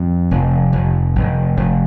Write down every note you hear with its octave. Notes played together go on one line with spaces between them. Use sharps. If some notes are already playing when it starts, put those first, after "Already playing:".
Already playing: F2
F1
F1
F1
F1